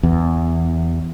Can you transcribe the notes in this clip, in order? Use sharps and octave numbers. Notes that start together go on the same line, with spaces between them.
E2